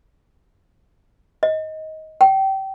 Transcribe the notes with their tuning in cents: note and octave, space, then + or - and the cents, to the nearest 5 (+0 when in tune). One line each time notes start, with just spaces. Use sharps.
D#5 +15
G5 -25